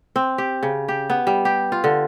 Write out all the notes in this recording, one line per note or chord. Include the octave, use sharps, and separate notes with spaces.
C4
G4
C#3
G4
B3
G3
G4
F4
D3